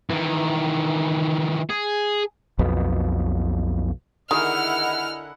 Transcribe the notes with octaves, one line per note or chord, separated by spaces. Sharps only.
D#3 E3
G#4
B1 F2 B2
D3 D#3 E4 G#4 A#4 D#5 F#5 F6